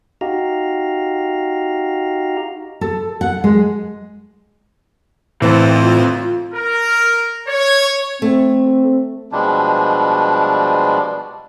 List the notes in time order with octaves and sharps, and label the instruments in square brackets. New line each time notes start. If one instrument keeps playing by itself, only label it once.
[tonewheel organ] D#4 F#4 G4 F5 A#5
[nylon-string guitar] A4
F#5
G#3
[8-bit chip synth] A2 C5 [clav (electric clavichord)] E3 [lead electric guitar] C4 A4
[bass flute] F4
[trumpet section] A#4
C#5
[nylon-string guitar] A3 [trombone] C4
[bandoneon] B2 F3 G3 G#3 D4